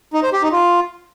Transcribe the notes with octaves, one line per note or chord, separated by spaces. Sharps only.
D#4
C5
G4
D#4
F4